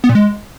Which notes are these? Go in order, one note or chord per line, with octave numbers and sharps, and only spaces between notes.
B3
A#2
G#3